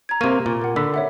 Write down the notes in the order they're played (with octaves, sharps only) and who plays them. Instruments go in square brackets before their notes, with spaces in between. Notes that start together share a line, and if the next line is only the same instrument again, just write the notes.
[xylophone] A#5 G#6
[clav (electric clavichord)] C3 A#3 [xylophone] C#6 D#7
[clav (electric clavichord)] A#2
[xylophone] A#4 F#5
[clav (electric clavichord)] D3 [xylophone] B5 E6 B6
[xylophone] C#5 E5 F#5